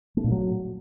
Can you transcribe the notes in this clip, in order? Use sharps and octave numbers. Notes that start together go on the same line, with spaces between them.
A3
A#2
F#3